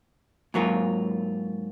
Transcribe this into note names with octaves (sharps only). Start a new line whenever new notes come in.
G#2 F#3 A#3 F4